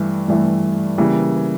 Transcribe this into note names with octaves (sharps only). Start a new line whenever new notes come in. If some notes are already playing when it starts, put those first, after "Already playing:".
Already playing: G2 E3 A3
G2 E3 A3
C#3 E3 G3 A#3